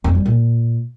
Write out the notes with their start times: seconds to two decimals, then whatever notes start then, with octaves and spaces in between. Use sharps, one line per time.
0.04 F2
0.15 G3
0.25 A#2